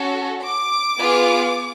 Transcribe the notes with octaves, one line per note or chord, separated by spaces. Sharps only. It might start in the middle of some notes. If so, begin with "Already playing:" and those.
Already playing: C#4 F#4 A4
D6
B3 F4 G#4